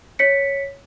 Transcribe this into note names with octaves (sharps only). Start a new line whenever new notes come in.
C#5 B6 C#7